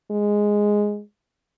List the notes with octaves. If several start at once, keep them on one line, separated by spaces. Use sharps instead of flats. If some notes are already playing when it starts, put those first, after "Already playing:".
G#3